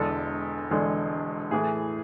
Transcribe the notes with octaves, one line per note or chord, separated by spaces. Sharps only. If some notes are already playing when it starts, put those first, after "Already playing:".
Already playing: E1 E2 D3 G#3 D4 A4
E1 E2 D3 G#3 D4
A2 E3 A3 G#4